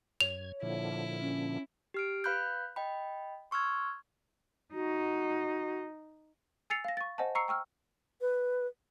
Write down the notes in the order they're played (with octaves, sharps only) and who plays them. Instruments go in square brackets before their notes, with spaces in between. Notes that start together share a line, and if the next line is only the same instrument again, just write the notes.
[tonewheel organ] F#2 G#6 [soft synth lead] C#5 [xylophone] F7
[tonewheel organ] A#2 D3 F3 [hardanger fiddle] E4
[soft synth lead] C#4
[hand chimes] G4 F6 D7
B4 F5 B5 F#6 G6
D#5 G5 B5
C6 C#6 E6 F6 G#6
[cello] D#4 [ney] F#4
[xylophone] G#5 E6 A6 C7 C#7 F7
F5 A#6
C#6 A6
C5 D#5 F#5 G#5 A5
A#5 C#6 E6 C7 C#7
G5 C#6 E6 F6
[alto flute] B4